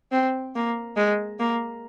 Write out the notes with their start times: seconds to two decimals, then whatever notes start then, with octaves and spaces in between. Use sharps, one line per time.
0.12 C4
0.55 A#3
0.97 G#3
1.39 A#3